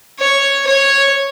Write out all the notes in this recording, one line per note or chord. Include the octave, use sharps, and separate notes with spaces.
C#5
C#5